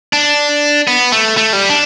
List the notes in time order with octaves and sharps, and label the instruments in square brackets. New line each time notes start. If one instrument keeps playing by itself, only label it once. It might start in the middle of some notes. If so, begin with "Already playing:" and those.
[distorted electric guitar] D4
B3
A3
A3
G3
D4